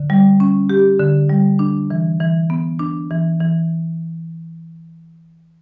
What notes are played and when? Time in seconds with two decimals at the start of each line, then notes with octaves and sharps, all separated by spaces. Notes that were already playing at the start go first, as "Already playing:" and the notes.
Already playing: D3
0.10 G3
0.40 C#4
0.70 G4
1.00 D3
1.29 G3
1.59 D4
1.90 E3
2.20 E3
2.50 B3
2.79 D4
3.11 E3
3.41 E3